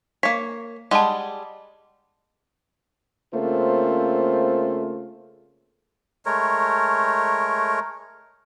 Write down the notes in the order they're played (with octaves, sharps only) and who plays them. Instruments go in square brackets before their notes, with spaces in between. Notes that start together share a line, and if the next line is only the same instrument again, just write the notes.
[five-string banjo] A#3 C#5 [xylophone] B6
[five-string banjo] G3 G#3 [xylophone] F#5 A5
[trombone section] C#3 A3 A#3 C4 F4 C5
[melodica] G#3 A3 A#4 C#5